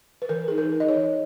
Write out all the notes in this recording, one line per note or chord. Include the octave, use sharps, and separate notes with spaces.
B4
E3 A#4
D#4 G#4
A#4
D#4
D#5
C#5
E3